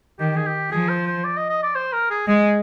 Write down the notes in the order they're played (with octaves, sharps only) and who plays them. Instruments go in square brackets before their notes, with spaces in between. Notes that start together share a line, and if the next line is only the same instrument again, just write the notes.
[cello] D#3 [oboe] G4
[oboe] G#4
G4
[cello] F3 [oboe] G#4
[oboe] C5
C5
D5
D#5
D#5
D5
C5
A#4
G#4
[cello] G#3 [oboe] G#4